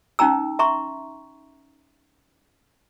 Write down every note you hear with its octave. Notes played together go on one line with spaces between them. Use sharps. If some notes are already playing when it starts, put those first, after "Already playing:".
C#4 D#4 G5 A#5 E6
E5 A#5 C6 C#6